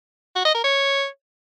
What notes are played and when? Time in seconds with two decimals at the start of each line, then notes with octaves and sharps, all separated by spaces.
0.36 F#4
0.45 D#5
0.54 A#4
0.64 C#5